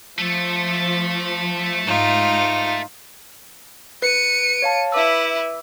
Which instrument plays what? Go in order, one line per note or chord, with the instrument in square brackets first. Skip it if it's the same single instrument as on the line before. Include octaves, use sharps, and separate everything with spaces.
[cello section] F3 [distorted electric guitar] A3 A4
[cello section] G#2 [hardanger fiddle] D#4 F4
[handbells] B4 [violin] C#7 D#7
[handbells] C#5 F5 A5
[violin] E4 B4 [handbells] E5 D6 E6